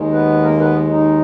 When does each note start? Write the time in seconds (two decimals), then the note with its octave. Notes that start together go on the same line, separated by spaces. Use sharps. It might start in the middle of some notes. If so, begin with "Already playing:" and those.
Already playing: D#2 D#3 G#3
0.12 B3 B4
0.43 A#3 A#4
0.59 B3 B4
0.91 D#3 D#4